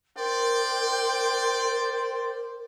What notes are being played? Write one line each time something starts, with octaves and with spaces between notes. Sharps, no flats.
A#4 C5 D5 G5